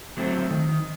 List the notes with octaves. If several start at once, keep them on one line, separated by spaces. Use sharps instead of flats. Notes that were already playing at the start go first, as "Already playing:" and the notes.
F#3 A3 C4
D#3